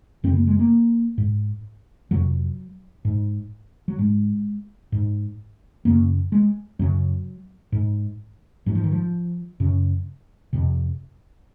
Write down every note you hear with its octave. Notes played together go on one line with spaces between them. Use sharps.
F#2 C#3 C4
A#3
G#3
A#3
G#2
F2 C3 F#3
G#2
F#3
G#2 G#3
G#2
F#2 C#3 A#3
G#3
F#2 C#3 F#3
G#2
G#2 F#3
F3
D#3
F3
F#2 C#3
F2 C3